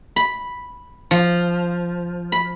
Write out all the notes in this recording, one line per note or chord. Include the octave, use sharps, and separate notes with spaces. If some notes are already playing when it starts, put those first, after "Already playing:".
B5
F3
B5